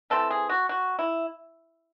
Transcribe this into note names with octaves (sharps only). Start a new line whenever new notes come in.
E3 A3 C4 A4
G#4
F#4
F#4
E4